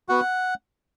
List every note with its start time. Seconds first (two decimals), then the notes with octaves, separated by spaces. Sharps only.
0.09 B3 F#4 F#5